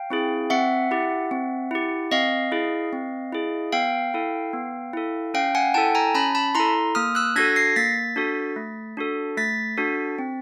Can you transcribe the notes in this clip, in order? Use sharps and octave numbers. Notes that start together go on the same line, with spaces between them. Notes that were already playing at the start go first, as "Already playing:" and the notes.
Already playing: F5 G5
C4 E4 G#4
C4 E5 F#5
E4 G4
C4
E4 G4
C4 D#5 F5
E4 G#4
C4
E4 G#4
B3 F5 G5
E4 A4
B3
E4 A4
C#4 F5 G5
F#5 G#5
E4 A4 G5 A5
G#5 A#5
C#4 A5 B5
A5 B5
E4 A4 A#5 C6
A#3 D#6 F6
E6 F#6
D4 F#4 A4 G#6 A#6
A#6 C7
A#3 A6 B6
D4 F#4 A4
A3
D4 F#4 A4
A3 A6 B6
D4 F#4 A4
C4